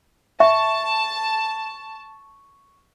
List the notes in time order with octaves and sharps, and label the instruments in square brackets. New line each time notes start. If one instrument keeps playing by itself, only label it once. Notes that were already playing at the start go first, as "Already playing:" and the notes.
[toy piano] E5 [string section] A5 [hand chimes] C#6